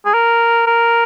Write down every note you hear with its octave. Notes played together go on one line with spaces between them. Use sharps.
G#4
A#4
A#4